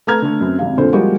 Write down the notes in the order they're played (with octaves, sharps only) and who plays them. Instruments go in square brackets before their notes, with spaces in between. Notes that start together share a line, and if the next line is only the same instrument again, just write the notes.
[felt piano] A3 B4 A#5 F6 G#6
D3 A3
F#2 C4
G#1 C3 F5
F1 A#2 D3 C5
F3 G3 G#3 A#3 F#4 G4